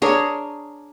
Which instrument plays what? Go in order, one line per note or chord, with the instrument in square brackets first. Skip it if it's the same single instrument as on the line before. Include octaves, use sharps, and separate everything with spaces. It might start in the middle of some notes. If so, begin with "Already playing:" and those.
[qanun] D4 G#4 A#4 C#5